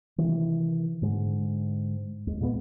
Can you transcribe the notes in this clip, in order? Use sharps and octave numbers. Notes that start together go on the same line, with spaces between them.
C3 D#3 E3
G#2 D3 G#3
D#2 G#3
A#2 G#3 A#3 B3